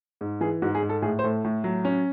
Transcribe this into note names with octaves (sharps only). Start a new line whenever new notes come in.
G#2
E3 G#4
G#2 F#4
G#4
G#2
A4
A2 G#4
C5
A2 A4
A2
F#3
C#4